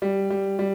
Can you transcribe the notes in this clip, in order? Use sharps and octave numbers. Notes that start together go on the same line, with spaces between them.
G3
G3
G3